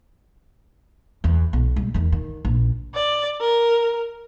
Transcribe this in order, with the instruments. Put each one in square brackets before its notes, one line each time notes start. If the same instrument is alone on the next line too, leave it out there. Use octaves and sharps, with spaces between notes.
[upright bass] E2
B1
G3
E2 D#3
D#3
A#1
[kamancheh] D5
A#4